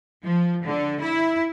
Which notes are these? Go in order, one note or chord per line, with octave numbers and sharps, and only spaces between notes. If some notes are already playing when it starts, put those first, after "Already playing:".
F3
D3
E4